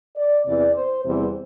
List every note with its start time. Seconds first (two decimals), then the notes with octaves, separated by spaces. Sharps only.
0.16 D5
0.45 E2 C3 E3 D5
0.74 C5
1.04 E2 C3 E3 G3 C5